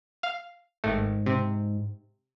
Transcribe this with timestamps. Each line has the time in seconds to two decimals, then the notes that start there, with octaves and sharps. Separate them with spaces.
0.23 F5
0.84 G#1 G#2 A3
1.26 C3